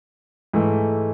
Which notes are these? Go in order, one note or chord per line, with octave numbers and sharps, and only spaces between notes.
G#2 E3 A3